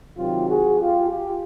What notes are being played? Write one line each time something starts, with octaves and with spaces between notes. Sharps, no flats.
C3 D#3 F#3 F4 G4
F#4 G#4
F4 G4
F4 G4